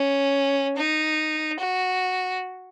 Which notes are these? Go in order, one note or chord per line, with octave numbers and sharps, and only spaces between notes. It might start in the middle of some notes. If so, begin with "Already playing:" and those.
Already playing: C#4
D#4
F#4